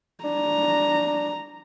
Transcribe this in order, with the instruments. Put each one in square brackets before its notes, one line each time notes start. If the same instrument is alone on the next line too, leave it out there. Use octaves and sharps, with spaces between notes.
[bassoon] D4 [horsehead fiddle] A#5